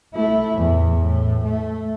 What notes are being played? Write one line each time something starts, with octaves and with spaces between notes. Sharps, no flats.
A3 E4
E2 A2
A2
A3